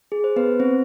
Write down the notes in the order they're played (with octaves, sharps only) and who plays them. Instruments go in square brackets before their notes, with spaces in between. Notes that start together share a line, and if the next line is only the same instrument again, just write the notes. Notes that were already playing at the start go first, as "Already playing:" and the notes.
[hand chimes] G#4
C5
B3 B4
C4 C5